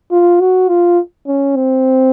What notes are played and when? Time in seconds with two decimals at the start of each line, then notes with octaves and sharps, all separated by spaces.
0.11 F4
0.41 F#4
0.69 F4
1.27 C#4
1.56 C4